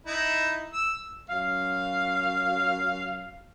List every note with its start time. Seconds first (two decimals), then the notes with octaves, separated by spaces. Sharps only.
0.07 D#4 E4
0.73 E6
1.29 F#2 F5